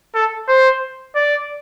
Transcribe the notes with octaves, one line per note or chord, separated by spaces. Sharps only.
A4
C5
D5